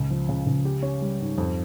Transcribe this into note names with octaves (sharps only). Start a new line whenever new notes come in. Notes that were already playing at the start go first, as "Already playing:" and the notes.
Already playing: C#2
F3
C#3
C#2
G4
C#4
G3
G#2
F2